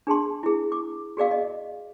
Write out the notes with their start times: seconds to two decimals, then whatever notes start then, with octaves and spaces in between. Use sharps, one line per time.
0.07 D4 G#4 A5 C6
0.43 E4 G#4
0.72 D6
1.17 F#4 G#4 D5 F5
1.31 D#5